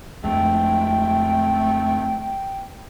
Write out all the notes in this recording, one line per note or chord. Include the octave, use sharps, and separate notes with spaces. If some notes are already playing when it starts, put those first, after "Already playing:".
F2 G#3 A3 G5